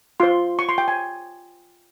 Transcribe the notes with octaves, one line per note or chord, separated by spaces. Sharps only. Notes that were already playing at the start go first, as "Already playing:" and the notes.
F4 C5 C6
C#6
C6
G5
G#5